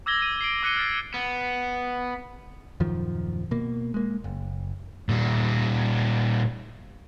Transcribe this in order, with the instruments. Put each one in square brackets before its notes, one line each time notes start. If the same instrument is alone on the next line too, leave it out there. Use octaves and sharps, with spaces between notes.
[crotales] D6 E6 G#6 A#6 G7
D#7
C7 D7
D6 F#6 A#6 C#7 D#7 G7
F6 A6 C7
[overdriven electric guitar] B3
[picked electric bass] D#1 F#2 D#3 F3
B2 A#3
G#3 A#3
F#1
[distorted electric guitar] A#2 G3